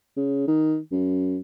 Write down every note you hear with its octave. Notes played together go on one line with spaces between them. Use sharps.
C#3
D#3
F#2